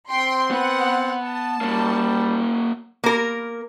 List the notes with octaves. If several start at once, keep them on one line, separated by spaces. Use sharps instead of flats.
C4 G5 C6
B3 B4 F#5
A5
G3 A#3 C#4
A#3 A#4